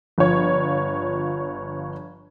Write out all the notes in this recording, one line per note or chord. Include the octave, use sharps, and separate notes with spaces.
G1 F3 C#5